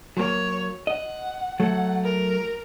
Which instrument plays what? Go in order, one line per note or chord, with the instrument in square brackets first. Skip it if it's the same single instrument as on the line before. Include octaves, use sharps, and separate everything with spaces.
[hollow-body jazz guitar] F#3 A#3 [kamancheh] C#5
[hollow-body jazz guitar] D#5 [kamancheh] F#5
[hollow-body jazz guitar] F#3 A3 [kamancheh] F#5
[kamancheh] A#4